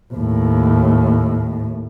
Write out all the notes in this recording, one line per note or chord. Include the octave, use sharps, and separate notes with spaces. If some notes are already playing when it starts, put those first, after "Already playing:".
D#2 A2